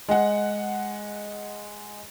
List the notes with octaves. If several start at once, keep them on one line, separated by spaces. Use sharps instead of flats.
G#3 F#5